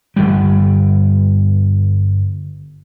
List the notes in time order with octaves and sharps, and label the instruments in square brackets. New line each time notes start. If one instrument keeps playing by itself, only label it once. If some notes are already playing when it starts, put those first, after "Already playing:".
[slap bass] G1 C#2 G3